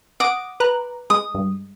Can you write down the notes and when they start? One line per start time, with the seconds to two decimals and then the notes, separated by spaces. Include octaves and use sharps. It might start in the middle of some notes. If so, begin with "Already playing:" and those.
0.20 F#5 D6 D#6 A#6
0.60 B4 A#5 F#6
1.10 G#3 D#6
1.34 G2